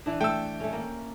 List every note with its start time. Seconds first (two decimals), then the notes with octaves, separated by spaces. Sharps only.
0.06 E3 D4
0.21 A3 G5 E6
0.60 A3 C#4
0.73 A#3